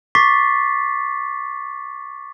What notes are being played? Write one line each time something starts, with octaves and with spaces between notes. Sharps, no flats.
C#6 D6 A6 B6 C7